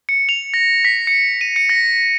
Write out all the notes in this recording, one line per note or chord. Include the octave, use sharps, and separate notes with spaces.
C#7
F7
A#6
B6
C#7
D#7
C#7
A#6